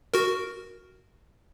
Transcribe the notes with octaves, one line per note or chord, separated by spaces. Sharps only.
F#4 A#4